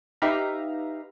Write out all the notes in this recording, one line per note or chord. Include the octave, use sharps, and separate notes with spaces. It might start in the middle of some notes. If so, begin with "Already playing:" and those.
D#4 G4 B4 E5 F5 A#5